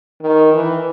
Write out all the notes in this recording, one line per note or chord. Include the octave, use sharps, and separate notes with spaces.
D#3
E3